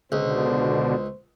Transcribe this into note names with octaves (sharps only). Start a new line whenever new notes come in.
C#2 B2 D3 C5